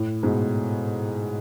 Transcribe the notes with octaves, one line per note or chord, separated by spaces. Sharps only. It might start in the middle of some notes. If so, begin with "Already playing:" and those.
Already playing: A2
G#2 B2